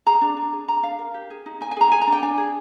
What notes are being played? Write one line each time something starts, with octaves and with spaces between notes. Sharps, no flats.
G#4 A#5
D4
D4
G#4
D4 A#5
D4 F5
A#4
G4
G#4
D#4
D#4 G#5
G#5
G#4 A#5
G#4 G#5
A#5
D4
G5
D4 G#5
G#4